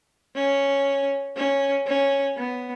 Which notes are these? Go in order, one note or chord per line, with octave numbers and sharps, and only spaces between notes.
C#4
C#4
C#4
B3